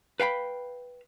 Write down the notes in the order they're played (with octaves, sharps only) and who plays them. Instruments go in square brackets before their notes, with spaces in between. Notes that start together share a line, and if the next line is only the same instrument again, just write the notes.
[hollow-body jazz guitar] B4 F5 G5 B5